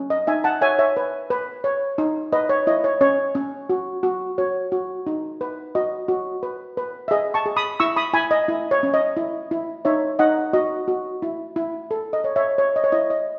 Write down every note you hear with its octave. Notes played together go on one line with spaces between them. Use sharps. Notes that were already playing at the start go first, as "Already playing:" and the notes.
Already playing: C#4
D#5
D#4 E5 G#5
F#5 A5
C#5 E5 G#5
C#5 E5
B4
B4
C#5
D#4
B4 D#5
C#5
E4 D#5
C#5
C#4 C#5
C#4
F#4
F#4
F#4 C#5
F#4
D#4
B4
F#4 D#5
F#4
B4
B4
E5
G#4 D#5
A5 C#6
G#4
B5 D#6
E4 C#6 E6
B5 D#6
E4 G#5 B5
D#5
E4
C#5
C#4
D#5
E4
E4
D#4 C#5 E5
D#4 D#5 F#5
F#4 D#5
F#4
E4
E4
A4
D#5
C#5
C#5 E5
C#5
D#5
C#5
E4 D#5
D#5